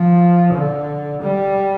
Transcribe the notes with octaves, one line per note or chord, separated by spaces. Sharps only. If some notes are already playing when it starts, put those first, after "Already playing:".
Already playing: F3
D3
G3